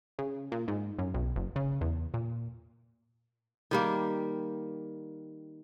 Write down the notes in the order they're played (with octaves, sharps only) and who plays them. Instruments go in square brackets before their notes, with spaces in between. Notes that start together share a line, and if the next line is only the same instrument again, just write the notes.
[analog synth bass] C#3
A#2
G#2
F#2
B1
F#1
C#3
E2
A#2
[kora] D#3 G3 A#3